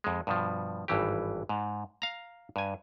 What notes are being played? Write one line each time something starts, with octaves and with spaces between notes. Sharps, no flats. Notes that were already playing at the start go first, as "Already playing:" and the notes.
F2 G#3
G2 B2 F3
G#1 G2 E3 G4
G#2
F5 A#5
G2 G#5